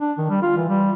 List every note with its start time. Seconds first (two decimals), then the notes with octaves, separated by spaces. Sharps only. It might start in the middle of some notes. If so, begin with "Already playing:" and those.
0.01 D4
0.18 D#3
0.30 G3
0.43 F4
0.57 E3
0.69 G3